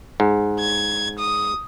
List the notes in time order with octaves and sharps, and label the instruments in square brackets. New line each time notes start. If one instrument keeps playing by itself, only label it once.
[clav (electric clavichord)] G#2
[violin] G#6
D#6